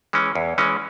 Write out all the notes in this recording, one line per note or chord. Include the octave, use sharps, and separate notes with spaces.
E3 G#3 C#4
E2
E3 G#3 C#4